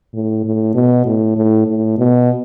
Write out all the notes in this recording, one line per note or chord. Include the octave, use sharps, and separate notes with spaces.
A2
A2
B2
A2
A2
A2
B2